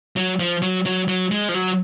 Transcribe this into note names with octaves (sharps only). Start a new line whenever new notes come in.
F#3
F3
F#3
F#3
F#3
G#3
F3
F#3